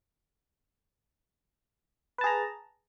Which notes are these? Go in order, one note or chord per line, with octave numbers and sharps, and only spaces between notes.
G#4 B4 A5 A#5